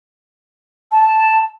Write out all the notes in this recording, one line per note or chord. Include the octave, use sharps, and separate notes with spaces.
A5